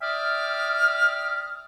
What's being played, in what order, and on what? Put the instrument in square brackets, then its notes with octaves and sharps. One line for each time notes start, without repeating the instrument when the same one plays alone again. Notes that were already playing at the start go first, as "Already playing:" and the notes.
[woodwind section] D5 E5 G5 D#6 F6